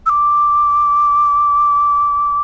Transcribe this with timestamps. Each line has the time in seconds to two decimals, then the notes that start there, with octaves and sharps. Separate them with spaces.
0.06 E6
0.10 D6